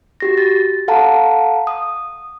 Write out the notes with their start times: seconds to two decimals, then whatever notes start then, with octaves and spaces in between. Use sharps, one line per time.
0.20 F#4 G4 A#6
0.38 A6
0.88 A4 F5 F#5 A5 A#5
1.67 D#6